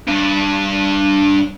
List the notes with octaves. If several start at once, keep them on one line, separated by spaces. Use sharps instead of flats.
G2 D4